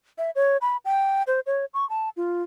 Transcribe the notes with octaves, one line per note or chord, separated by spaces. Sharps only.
E5
C#5
B5
G5
C5
C#5
C#6
A5
F4